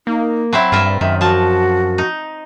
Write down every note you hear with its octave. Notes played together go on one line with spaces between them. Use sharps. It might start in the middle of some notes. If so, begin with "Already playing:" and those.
A#3 D#4
F#3 C4 E4 B5
G2 F4 A#4 E5
F#2 D#3 E5
F3 F#4 A5
D#4